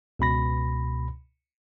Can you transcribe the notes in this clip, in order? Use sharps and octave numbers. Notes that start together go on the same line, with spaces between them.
C#2 B2 B5 A#6